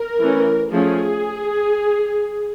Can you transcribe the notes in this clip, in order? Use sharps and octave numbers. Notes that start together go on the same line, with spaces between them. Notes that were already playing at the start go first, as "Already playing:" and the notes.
Already playing: A#4
E3 A3 C#4
F3 A3 C#4 G#4